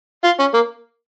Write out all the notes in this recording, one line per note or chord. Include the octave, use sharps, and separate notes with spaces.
F4
C#4
A#3